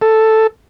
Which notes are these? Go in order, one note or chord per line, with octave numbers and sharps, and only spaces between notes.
A4